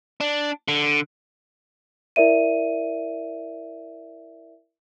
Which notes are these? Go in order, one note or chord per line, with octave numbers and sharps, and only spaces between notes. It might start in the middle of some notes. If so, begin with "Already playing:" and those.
D4
D3
E4 A#4 D5 E5 D#7